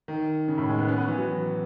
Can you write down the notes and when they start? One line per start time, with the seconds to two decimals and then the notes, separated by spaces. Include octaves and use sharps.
0.08 D#3
0.48 C#3
0.58 A2
0.68 G#3
0.78 B3
0.88 C#4
0.98 B3
1.08 E3
1.18 F#3